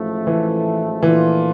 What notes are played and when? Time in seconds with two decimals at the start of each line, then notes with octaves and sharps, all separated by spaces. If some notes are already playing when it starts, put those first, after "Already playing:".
Already playing: A1 G#2 F3 A3
0.27 E3
1.03 A#2 E3 F3 A3 D4 F4